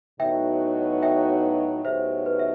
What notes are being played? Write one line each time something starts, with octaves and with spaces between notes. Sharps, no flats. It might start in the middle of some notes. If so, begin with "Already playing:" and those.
A2 F#3 B3 D#4 F#4 E5 G5
E5 G5
A2 F#3 B3 D#4 G4 C5 E5
B4
E5